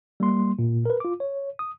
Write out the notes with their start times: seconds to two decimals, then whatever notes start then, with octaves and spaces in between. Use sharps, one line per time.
0.20 G3 A#3 C6
0.59 A#2
0.85 A#4 B4
1.00 F4 D6
1.20 C#5
1.59 D#6